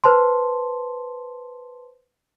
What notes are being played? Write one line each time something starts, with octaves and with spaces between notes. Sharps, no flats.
B4 C5 A5 C6